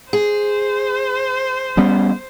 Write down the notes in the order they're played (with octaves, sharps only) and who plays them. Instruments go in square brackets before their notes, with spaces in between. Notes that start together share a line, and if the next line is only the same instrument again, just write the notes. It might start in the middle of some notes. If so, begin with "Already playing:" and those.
[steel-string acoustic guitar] G#4 [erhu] C5
[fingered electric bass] G3 B3 C#4